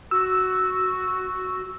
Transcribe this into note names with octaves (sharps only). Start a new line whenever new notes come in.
F#4 E6